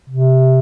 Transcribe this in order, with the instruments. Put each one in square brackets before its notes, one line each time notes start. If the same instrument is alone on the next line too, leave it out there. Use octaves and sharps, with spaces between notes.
[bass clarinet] C3